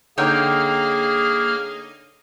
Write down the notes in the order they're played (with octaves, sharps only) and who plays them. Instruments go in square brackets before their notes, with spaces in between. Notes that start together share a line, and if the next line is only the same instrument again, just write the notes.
[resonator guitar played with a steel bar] D3 D#4 [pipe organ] A#3 F6 [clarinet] G#4 [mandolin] C#5 G5